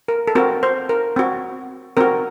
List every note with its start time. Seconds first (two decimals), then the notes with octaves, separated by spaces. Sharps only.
0.08 A#4
0.28 A4
0.35 C4 F#4 A#4
0.63 C5
0.89 A#4
1.16 C4 F#4
1.97 C4 F#4 A#4